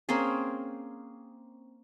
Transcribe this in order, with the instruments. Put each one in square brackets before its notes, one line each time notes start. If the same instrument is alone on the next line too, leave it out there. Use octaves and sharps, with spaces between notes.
[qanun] A#3 C4 C#4 G#4